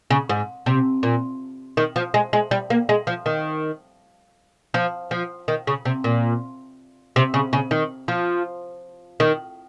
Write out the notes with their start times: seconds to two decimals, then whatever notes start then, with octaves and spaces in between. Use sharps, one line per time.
0.11 C#3
0.29 G#2
0.66 C3
1.03 A#2
1.77 D#3
1.96 F3
2.14 G#3
2.33 G#3
2.51 G3
2.70 A#3
2.89 G#3
3.07 F3
3.26 D#3
4.74 F3
5.11 F3
5.48 D#3
5.67 C#3
5.85 C3
6.04 A#2
7.16 C3
7.34 C#3
7.53 C#3
7.71 D#3
8.08 F3
9.20 D#3